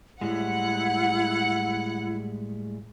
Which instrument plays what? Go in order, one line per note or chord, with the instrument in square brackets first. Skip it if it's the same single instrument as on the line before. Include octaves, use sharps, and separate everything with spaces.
[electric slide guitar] A2 G3 G#3 [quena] E4 [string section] F#5